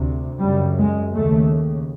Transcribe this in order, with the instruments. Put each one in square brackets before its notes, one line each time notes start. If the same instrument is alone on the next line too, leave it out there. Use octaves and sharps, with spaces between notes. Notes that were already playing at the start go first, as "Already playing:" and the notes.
Already playing: [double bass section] D2 C3
F#2 C#3 G3
G#3
D#2 C#3 A3